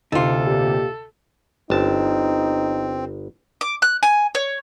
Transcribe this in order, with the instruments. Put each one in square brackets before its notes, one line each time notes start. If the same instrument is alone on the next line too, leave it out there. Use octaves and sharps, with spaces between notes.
[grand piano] D2 C3 [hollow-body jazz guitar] D#4 F4 [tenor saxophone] A4
[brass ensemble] A#2 G4
[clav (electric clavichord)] G1 A5 [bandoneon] C4 [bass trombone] D#4
[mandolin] D6
F#6
G#5
C#5